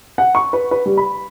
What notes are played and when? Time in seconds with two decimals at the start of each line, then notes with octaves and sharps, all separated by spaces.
0.18 F#5
0.35 C#6
0.53 B4
0.71 B4
0.86 G3
0.97 B5